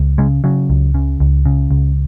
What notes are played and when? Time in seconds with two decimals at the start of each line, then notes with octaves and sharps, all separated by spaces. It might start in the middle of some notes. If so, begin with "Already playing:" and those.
Already playing: C#2
0.18 C#3 G#3
0.44 C#3 F#3
0.70 C#2
0.94 C#3
1.20 C#2
1.46 C#3
1.71 C#2